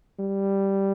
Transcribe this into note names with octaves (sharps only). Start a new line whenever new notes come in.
G3